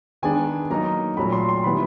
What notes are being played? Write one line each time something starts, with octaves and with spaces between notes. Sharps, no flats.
D#3 G#3 B3 D4 G#5
F#3 A#3 D#4 A#5
A#2 F#3 A3 B5
C6
C6
D#3 G3 B3 E4 B5